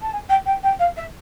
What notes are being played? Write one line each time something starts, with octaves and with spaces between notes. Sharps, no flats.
A5
G#5
G5
G5
G5
F5
E5